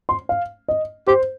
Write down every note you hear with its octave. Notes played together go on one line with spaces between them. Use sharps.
C6
F5
D#5
G4 C5